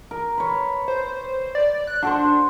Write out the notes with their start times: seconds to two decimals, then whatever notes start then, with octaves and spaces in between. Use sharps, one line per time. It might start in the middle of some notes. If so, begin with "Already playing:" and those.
0.11 A#4
0.38 B4 C#5
0.88 C5
1.55 D5
1.87 F#6
2.03 D4 F#4 A4 C5